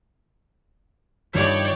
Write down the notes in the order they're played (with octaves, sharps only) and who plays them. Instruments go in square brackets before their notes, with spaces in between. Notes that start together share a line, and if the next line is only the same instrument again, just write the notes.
[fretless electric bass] G2 D#3 F3 [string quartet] C#5 D5 G5